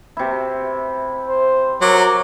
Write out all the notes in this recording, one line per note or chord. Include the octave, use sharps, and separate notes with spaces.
C3 E4
C5
F#3 A#4 D6